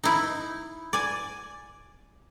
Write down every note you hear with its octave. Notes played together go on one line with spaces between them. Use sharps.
D#4 E4
D5 G#5